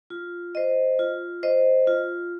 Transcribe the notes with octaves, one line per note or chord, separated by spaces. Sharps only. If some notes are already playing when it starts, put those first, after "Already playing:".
F4
C5 D#5
F4
C5 D#5
F4